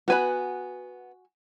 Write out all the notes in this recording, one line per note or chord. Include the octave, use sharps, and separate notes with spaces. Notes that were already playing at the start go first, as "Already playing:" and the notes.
B3 F#4 B4 G#5 B5